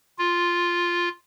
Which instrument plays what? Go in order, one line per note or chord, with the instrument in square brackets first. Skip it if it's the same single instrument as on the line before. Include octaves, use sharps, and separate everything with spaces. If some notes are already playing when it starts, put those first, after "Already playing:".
[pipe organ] F4